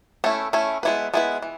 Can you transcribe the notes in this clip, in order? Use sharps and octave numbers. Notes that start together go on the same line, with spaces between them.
A3 C#4 E4
A3 C#4 E4
G#3 B3 E4 B4
G#3 B3 E4 B4
E3